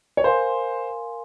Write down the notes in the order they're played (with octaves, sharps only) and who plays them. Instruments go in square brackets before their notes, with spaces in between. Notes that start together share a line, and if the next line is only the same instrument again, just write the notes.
[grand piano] C#5
[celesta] A#4 F5 G#5 C6 [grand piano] C5